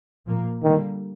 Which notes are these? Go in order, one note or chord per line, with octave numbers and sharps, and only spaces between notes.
A#2 F3 A#3
D3 D#3 G3 A#3